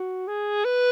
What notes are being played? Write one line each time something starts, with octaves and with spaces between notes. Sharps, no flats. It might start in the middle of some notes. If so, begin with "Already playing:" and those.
Already playing: F#4
G#4
B4